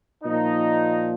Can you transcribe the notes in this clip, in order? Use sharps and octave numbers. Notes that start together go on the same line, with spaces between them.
A#2 F3 D#4